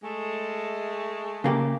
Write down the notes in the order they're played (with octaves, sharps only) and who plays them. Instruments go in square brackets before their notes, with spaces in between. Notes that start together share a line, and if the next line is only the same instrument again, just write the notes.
[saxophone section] G#3 A3
[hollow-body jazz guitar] C#3 A#3 G4